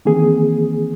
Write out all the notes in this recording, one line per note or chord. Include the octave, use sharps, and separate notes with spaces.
D#3 E3 A#3 C4 G#4